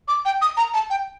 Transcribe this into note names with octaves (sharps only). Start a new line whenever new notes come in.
D6
G5
D#6
A#5
A5
G5